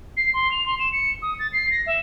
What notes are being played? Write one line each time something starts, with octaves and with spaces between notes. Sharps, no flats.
C7
C6
F7
C6
E7
C#7
D#6
A6
C7
A#6
E5